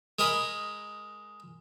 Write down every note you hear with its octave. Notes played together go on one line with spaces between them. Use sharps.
G#3 A#4 D#5 B5